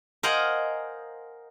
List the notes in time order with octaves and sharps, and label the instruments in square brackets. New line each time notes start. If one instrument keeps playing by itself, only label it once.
[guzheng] A#4 C5 D#5 F5 F#5 G#5